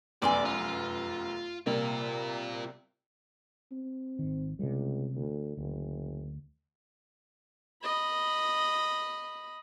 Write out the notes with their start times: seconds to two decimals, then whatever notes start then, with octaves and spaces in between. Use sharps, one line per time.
0.22 F1 F#2 B3 D5 G#5 C6 D6
0.45 F4
1.66 C3 G3 A#3 F4 A#4
3.71 C4
4.19 G#1 D#3
4.59 C#2 C3 G3
5.15 D2
5.57 F#1 D2
7.83 D#5 B5